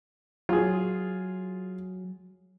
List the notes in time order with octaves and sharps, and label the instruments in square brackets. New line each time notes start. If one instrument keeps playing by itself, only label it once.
[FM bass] F#3 [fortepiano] F4 G#4